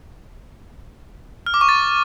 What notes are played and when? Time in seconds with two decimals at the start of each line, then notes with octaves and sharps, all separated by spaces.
1.46 F6
1.54 D6
1.61 C#6
1.69 A6